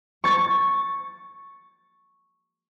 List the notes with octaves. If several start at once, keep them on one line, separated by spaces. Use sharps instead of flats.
C#6 A6